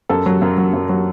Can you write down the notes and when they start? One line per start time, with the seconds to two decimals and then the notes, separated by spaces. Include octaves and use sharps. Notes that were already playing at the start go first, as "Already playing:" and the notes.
0.09 F#2 A4
0.26 F#3
0.42 F#2
0.58 F#3
0.73 F#2
0.89 F#3